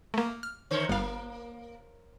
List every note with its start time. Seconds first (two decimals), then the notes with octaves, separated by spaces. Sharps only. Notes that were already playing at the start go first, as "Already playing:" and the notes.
0.14 A3 A#3
0.43 F6
0.71 D3 C5 C#5
0.89 G1 A#3 F5